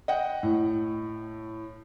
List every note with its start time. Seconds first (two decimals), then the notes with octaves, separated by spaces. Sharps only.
0.08 D#5 F#5 G5
0.43 A2